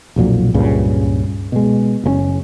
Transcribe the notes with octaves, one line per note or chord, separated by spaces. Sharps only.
B1 F2 A#2 F#3
C#2 G2 A#2 C#3
B2 G#3
F#1 A#2 C#4